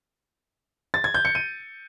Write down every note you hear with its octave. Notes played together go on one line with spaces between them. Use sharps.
A6
G#6
G6
C#7
D#7